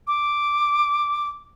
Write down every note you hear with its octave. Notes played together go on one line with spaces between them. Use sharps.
D6